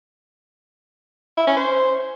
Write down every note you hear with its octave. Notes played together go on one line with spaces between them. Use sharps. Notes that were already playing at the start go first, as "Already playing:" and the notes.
E4
C#4
C5